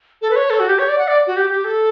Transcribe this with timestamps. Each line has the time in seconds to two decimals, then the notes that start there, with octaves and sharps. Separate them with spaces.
0.22 A4
0.30 B4
0.36 C#5
0.50 A4
0.60 F#4
0.69 G4
0.79 C#5
0.88 D5
0.98 F#5
1.08 D5
1.27 F#4
1.37 G4
1.50 G4
1.65 A4